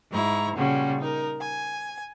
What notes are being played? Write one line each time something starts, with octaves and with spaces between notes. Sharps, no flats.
G#2 E4 A#5 C#6
A#2 C#3 G3 C#4 F#4
D#4 A#4
G#5